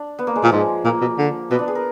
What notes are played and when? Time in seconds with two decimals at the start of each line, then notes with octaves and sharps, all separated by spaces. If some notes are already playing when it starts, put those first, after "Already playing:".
Already playing: D4
0.19 B3
0.27 A#3
0.36 G#3
0.43 A#2 F3
0.52 G#2 G#3
0.85 A#2 A#3
1.01 B2
1.18 D3
1.51 B2 B3
1.59 D4
1.68 G#4
1.75 A#4